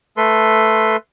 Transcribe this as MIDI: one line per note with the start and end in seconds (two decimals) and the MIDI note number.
0.17 0.96 57
0.17 0.96 69
0.17 0.96 71
0.17 0.96 84